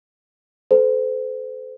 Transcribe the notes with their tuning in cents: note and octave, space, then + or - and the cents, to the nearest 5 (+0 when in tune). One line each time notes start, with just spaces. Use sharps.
A4 -25 C5 -35